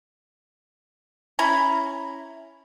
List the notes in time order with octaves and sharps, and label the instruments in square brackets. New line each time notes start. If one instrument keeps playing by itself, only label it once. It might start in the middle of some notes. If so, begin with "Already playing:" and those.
[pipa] C#4 E4 A#5 B5